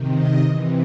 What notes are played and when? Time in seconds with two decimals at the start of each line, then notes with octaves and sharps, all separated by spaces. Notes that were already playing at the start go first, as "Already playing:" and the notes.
Already playing: C3 D#3
0.11 D#5
0.44 C3 E3